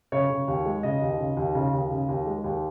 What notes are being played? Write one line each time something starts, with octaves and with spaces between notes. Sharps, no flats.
C#3 C#5
C#3
D#2
G#3
C#3 D#5
D#2
C#3
D#2
C#3
D#2
C#3
D#2
G#3
D#2